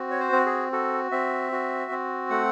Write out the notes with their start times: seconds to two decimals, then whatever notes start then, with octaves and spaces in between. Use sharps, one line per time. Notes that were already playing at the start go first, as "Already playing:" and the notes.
Already playing: C4 F#4
0.11 C#5
0.20 C5
0.32 C4
0.46 G#4
0.72 F#4 A4
1.12 C4 E5
1.52 F#4
1.91 C4
2.30 A3 F#5